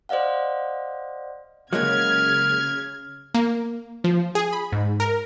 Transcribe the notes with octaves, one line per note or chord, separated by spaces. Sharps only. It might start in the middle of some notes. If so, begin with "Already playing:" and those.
C5 D5 D#5 F5 F#5
C#3 F#3 G#3 A#3 F6 G#6
A#3
F3
G#4
B5
G#2
A#4